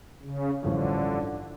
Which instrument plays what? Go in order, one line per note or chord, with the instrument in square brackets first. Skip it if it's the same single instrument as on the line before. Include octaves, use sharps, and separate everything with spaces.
[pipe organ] C#3
[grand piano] A1 G2 F3 C#4 [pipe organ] D3